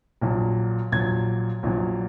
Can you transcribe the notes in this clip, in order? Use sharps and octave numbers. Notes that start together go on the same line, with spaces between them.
A#1 A#2 F#3
A#1 A#2 F#3 G#6
A#1 A#2 F#3